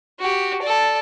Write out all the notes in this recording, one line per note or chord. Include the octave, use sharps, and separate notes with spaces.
F#4 G4
A4 D5